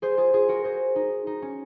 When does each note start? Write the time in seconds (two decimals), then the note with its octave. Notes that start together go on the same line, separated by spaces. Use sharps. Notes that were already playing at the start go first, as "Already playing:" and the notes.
0.02 G#4 C5
0.17 F4 G#4
0.34 F4 G#4
0.49 F#4 A#4
0.64 G#4 C5
0.96 D#4
1.27 D#4
1.42 C#4